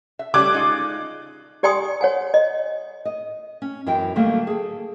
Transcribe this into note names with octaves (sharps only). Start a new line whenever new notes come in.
E5
C#3 G3 A3 D6 F#6 G#6
G#3 D#4 F4
G4 D5 G5 G#5 C6 D#6
C#5 F#5 G#5
D#5
D#5
C#4
F#2 E3 B3 F#4 E5 G5
D3 D#3 F#3 G3 A3 A#3
G#4 A4